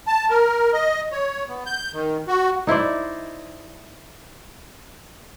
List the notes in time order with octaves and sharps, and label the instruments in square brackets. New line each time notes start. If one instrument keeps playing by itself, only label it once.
[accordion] A5
A#4
D#5
C#5
B3
G6
D#3
F#4
[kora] D#4 E4 C5 D5